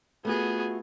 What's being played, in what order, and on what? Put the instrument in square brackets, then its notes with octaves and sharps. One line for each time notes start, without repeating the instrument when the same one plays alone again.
[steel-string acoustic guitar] A3 F4 F#4 [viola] B3 G#4